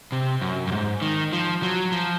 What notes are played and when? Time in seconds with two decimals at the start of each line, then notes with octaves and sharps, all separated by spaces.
0.12 C3
0.42 F#2
0.67 F#2
0.72 G#2
1.02 D#3
1.33 F3
1.62 F#3
1.92 F3